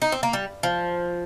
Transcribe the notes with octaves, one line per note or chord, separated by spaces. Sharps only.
D#4
C4
A#3
G3
F3